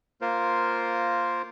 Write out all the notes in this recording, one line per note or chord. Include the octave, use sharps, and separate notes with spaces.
A#3 F4 A#4 C5